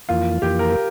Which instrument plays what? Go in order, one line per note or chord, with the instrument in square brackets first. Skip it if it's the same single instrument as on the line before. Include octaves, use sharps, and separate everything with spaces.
[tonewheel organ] F2 E3 A#3 [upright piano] F4
[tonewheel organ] F2 E3 A#3 [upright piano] G4
[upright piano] A#4